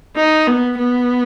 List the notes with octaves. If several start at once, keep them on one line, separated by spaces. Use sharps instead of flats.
D#4
B3
B3